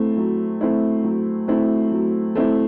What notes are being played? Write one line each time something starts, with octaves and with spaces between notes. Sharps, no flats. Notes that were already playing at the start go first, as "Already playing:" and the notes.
Already playing: A3 C4 E4
F#3
A3 C4 E4
F#3
A3 C4 E4
F#3
A3 C4 E4